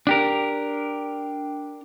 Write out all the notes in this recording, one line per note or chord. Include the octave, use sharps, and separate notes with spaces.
D4 G4 A#4